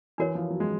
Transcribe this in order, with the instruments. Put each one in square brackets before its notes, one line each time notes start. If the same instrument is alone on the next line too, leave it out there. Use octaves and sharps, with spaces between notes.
[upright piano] E3 [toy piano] D4 F#4 A#4 C#5
[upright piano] F3
F#3
G#3